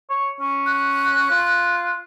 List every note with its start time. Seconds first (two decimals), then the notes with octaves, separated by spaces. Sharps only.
0.10 C#5
0.41 C#4
0.66 F#6
1.31 F4